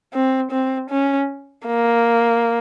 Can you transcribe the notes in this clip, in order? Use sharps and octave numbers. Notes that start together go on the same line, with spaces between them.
C4
C4
C#4
A#3